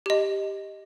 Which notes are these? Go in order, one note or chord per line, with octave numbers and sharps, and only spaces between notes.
G4 D#5